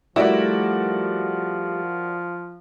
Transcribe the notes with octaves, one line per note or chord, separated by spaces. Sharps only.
F3 G3 A3 E4 F#4 A#4 D5